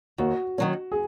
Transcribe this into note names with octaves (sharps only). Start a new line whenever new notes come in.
D#2 F#4
D#3 F#3 C#4
G#4